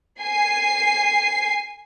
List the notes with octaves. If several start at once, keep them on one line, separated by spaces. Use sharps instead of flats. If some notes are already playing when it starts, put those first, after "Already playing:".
G#5 C7